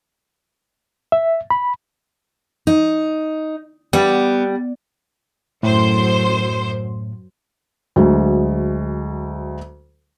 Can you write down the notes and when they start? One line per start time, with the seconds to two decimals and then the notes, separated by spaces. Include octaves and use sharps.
1.12 E5
1.50 B5
2.67 D#4
3.93 G3 B3
5.63 F#2 A2 C5
7.96 D2 F#3 G#3